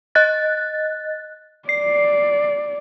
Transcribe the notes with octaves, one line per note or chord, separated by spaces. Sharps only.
D#5 F#6 A6
D5 C7